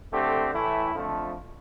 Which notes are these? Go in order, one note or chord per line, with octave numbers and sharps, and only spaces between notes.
D3 A3 C4 G4
A2 E3 A3 E4
F2 D3 F3 A3